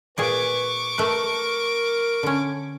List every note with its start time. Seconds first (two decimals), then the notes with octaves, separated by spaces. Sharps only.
0.18 A#2 G#4 B4 D5 C#6 D6
0.98 A3 A#4 B4
2.23 D3 C#4